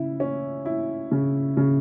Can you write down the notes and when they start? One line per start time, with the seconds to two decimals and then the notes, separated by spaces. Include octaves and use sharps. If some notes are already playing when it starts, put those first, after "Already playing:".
Already playing: C#3 E4
0.20 C#4
0.66 E4
1.12 C#3
1.57 C#3